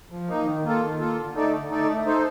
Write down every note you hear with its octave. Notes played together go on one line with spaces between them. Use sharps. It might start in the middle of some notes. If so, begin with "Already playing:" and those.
F3
A#3 D#4
D#3
A#3 F4 A4
D#3
A#3 F4 A4
D3
A3 D#4 A4 D5
D3
A3 D#4 A4 D5
A3
D#4 A4 C5